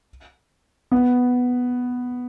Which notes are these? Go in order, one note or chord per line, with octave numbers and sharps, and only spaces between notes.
B3